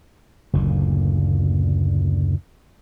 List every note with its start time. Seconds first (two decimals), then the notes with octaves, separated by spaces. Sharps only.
0.53 F#1 D2 A#2